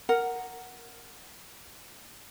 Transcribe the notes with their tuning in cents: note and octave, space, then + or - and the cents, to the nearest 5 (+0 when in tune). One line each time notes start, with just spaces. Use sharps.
A#4 +0 F#5 +0